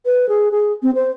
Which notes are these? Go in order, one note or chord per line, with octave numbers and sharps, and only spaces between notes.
B4
G#4
G#4
C4
C5